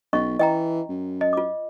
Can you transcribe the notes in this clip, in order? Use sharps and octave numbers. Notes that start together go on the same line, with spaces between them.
B1 C#4 D#5 C#6
E3 D#5 G5 A#5
F#2
D#5
F4 D6